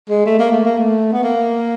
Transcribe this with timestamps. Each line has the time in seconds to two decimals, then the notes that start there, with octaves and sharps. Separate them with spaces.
0.10 G#3
0.26 A3
0.39 A#3
0.52 A3
0.65 A#3
0.78 A3
1.12 B3
1.23 A#3